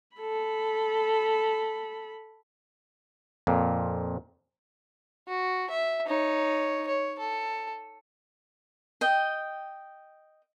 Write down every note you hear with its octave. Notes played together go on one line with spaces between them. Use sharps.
A4 B5
F2 A#2
F#4
E5
D#4 C#5
C#5
A4
D#5 G5